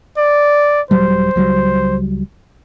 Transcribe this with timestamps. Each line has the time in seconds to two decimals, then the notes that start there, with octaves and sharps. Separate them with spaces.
0.18 D5
0.91 D#1 F#3 G3 C5
1.36 C#2 F#3 G3